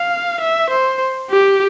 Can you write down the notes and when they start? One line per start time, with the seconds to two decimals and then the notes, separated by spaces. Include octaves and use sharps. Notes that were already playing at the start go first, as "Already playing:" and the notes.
Already playing: F5
0.41 E5
0.70 C5
1.31 G4